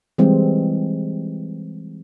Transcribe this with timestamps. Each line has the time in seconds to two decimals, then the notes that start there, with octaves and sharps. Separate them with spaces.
0.18 E3 G3 G#3 C4